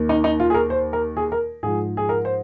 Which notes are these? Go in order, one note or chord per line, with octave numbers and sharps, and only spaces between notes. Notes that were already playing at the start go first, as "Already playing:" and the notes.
Already playing: D#2 D#3
D#4
D#4
F4
G#4
A#4
C5
A#4
G#4
A#4
G#2 F3 G#4
G#4
A#4
C5